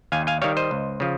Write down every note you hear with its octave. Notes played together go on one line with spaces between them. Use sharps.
D#2 F5 G#5
F5 G#5
D#3 G3 C#5 F5
C5 D#5
C#2
C#3 F3